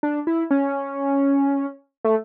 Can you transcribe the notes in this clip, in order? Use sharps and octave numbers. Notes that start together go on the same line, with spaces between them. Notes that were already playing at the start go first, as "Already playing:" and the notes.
D4
E4
C#4
A3